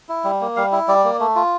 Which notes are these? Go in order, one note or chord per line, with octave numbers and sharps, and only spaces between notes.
E4
G3
A#3
G3 F5
E4
G3 D5
A#3
A3
F4